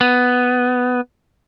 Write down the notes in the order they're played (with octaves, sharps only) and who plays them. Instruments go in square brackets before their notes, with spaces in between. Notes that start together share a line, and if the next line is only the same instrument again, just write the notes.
[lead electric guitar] B3